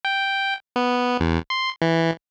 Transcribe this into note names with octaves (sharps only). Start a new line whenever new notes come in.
G5
B3
E2
C6
E3